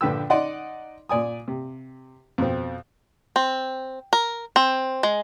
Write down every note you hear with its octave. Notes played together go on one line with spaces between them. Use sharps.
A#1 D3 B4 G5 E6
D#4 D5 D#5 F#5 C6
A#2 D5 G#5 D#6
C3
F2 B2 C4
C4
A#4
C4
G#3